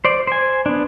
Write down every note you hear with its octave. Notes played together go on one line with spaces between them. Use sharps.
C5 D5
C5 G#5
B3 D4